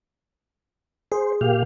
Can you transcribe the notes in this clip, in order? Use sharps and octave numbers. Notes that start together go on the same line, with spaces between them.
G#4 C5
A#2 G4 F5